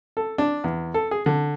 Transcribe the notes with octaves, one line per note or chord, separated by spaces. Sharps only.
A4
D4
E2
A4
G#4
D3